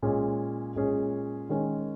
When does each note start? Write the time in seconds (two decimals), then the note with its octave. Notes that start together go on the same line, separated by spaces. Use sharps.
0.02 A#2 G#3 C#4 G#4
0.76 A#2 G#3 C#4 G#4
1.49 D#3 G#3 C#4 A#4